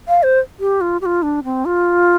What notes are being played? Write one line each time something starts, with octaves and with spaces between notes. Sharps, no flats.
F5
C5
G4
F4
G4
F4
D4
C4
F4